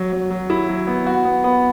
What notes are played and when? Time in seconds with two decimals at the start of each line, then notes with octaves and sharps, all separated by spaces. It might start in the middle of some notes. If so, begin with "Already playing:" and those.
Already playing: F#3
0.12 F#3
0.30 F#3
0.50 E4
0.69 F#3
0.87 B3
1.07 F#4
1.25 B3
1.44 B3